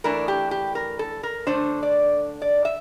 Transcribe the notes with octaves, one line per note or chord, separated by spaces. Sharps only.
E3 A3 D4 A#4
G4
G4
A#4
A4
A#4
D3 A3 D4 C5
D5
D5
E5